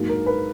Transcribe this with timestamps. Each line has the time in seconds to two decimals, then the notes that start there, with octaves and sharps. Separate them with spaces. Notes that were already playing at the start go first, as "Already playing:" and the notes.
Already playing: G#2 F#3 A#3
0.09 A#4
0.26 B4